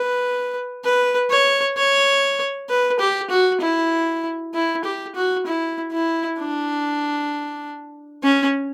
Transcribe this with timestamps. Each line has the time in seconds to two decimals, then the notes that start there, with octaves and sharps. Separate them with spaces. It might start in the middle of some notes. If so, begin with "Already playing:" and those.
Already playing: B4
0.84 B4
1.30 C#5
1.77 C#5
2.69 B4
3.00 G4
3.30 F#4
3.61 E4
4.54 E4
4.85 G4
5.15 F#4
5.46 E4
5.93 E4
6.39 D4
8.24 C#4